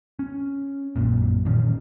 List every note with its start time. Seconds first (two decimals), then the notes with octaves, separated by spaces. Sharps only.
0.19 C#4
0.96 A#1 F#2 A#2
1.45 A1 A#2 D#3 C#4